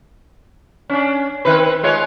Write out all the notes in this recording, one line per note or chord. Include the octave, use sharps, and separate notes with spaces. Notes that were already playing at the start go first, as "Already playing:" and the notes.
C#4 D4
D#3 C4 B4
G#3 F4 C#5